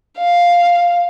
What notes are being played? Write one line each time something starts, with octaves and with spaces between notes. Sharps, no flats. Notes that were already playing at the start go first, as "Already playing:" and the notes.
F5